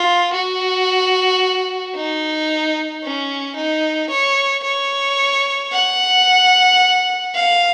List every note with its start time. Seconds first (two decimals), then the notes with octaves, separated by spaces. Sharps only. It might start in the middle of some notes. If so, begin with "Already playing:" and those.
Already playing: F4
0.34 F#4
1.96 D#4
3.04 C#4
3.57 D#4
4.11 C#5
4.64 C#5
5.72 F#5
7.35 F5